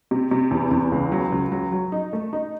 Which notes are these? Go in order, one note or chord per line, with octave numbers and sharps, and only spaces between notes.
C3
C3
E2
E2
C#2
F#3
C#2
F#3
F#3
D#4
A3
D#4